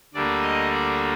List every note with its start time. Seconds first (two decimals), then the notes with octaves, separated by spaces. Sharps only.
0.14 D2 D3 G3 A#3 D5
0.42 D#5
0.70 D5